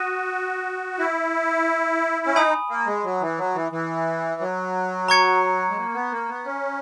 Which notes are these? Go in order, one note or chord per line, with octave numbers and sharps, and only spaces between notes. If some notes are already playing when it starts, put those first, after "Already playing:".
Already playing: F#4 D#6 A#6 D#7
E4
C#4
D#4 G#5 B5 D#6
A#3
G#3
F#3
E3
F#3
E3
E3
F#3
A#5 C#6 G#6 C#7
G#3
A#3
B3
A#3
B3
C#4